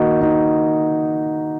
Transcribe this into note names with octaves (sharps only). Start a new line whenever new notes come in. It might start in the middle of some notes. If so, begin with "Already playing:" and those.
Already playing: D#3 A#3 D#4 F#4
D#4